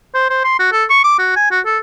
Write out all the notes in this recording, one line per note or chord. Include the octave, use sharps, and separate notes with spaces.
C5
C5
C6
F#4
A4
C#6
D6
F#4
G#5
F#4
A4